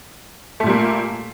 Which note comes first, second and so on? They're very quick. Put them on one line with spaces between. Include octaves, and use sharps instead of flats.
A3 A#2 G3 A#3